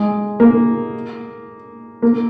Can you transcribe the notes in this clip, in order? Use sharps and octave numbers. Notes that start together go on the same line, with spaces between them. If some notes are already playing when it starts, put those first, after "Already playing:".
Already playing: G#3
A#3
A#3